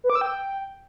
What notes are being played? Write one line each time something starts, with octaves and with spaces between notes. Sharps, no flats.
B4
D6
E6
G5